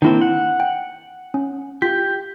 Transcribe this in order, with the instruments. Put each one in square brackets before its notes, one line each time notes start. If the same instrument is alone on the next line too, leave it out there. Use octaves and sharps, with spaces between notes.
[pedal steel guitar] D#3 A#3 C4 [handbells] D4 E4
[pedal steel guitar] F#5
[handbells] G5
C#4
[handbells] F4 B6 [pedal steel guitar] G4